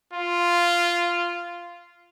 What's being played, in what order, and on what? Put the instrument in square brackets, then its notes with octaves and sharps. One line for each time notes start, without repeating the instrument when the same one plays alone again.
[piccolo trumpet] F4